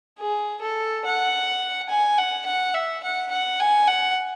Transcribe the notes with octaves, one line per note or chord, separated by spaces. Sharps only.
G#4
A4
F#5
G#5
F#5
F#5
E5
F#5
F#5
G#5
F#5